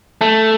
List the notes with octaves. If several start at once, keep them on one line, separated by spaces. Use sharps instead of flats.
A3 A5